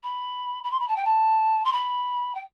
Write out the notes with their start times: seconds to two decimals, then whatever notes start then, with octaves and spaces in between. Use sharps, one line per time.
0.03 B5
0.63 B5
0.71 C6
0.79 B5
0.88 A5
0.96 G5
1.05 A5
1.64 C6
1.72 B5
2.34 G5